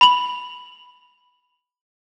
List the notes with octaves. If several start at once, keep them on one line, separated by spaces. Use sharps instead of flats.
B5 F7 F#7